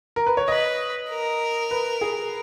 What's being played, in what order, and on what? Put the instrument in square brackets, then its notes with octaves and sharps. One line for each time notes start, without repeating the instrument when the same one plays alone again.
[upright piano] A#4
B4
C#5
[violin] B4 [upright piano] D#5
[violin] A#4
[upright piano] B4
G#4